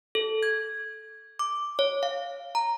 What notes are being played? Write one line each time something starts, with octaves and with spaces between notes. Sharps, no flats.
A4
G#6
D6
C#5
F5
A#5